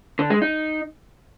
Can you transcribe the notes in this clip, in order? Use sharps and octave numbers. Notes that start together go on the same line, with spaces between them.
D3
G#3
D#4